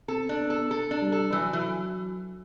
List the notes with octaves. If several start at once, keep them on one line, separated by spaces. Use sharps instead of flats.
C4 A4
D4
B3
A4
A4
D4
G3
A4
E3 F#3
E3